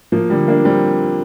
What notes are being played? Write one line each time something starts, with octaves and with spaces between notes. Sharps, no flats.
F3 A#3
D3 G3
A#3 D4
G3 C4